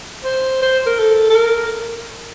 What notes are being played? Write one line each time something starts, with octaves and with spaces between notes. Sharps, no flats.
C5
C5
A#4
A4
A4
A#4